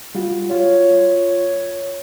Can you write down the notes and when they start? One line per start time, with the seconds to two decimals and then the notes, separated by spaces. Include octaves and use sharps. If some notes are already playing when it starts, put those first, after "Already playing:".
0.15 G3 F4 F#4
0.51 F4 C#5